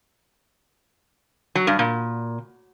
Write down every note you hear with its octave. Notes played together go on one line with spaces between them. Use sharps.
F#3
G2
A#2